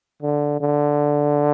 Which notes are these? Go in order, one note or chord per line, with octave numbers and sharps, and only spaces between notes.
D3
D3